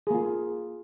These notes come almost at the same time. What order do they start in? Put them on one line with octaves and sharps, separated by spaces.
G#4 A#3 F4